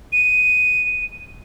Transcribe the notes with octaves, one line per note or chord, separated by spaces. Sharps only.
D#7